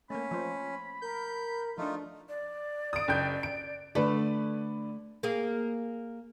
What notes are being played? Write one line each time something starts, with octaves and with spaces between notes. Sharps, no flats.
A3 A#3 C#4 B5
F3 C5
A#4 G6
F3 A3 D4 D#4 F4
D5
D#6 D7
F#1 G5 G6
D7
D3 A3 B4 D5
A#3 G#4